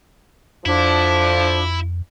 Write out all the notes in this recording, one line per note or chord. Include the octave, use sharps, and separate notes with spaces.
F2 D3 F3 D4 E4